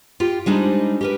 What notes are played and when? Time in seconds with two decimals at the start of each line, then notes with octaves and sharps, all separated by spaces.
0.20 F4 G4 G5
0.46 G3 G#3 D4 D#4 C5
1.01 G4 A#4 B4